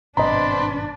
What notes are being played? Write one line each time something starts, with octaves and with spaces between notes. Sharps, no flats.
G#1 G2 B2 C4 D4 B4 D#5 A#5